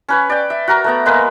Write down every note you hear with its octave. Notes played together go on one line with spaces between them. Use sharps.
C#4 B4 C#5
D5 G5
E5
F#4 A#4 A#5
A3 B3 A#5
G#3 A#3 B4